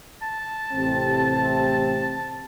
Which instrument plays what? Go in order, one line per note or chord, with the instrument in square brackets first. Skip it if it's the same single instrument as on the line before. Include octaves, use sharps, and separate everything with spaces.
[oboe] A5
[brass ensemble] A1 C3 C4